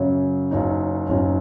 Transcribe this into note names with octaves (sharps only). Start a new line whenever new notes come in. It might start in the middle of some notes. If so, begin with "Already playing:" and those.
Already playing: F#2 C#3 F#3
F#1 F#2 F#3 D#4
F#1 F#2 F#3 D#4